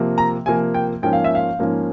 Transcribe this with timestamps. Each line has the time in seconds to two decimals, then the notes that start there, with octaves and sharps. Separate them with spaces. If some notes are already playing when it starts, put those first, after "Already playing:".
Already playing: C3 F3 A#3
0.18 A#5
0.46 C3 F3 A#3 G#5
0.74 G5
1.02 G#2 F3 A#3 C#4 G5
1.13 F5
1.24 E5
1.35 F5
1.59 G#2 F3 A#3 C#4